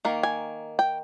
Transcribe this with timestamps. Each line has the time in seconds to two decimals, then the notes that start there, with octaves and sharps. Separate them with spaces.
0.05 D#3 A#3
0.23 G#5
0.79 G5